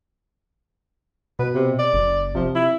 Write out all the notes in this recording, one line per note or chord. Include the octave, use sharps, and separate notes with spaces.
B2 B4
C3
D5
F#1
C3 F3
E4